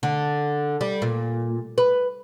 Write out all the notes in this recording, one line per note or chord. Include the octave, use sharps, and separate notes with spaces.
D3
G3
A#2
B4